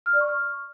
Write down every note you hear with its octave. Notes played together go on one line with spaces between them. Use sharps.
F6
D5
C#6
F6